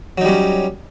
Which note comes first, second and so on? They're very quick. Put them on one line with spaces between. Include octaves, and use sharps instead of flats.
F#3 D#4 G3 C#4